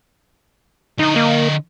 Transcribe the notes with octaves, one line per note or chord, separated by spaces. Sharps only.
D3 D#4 D#5
A#3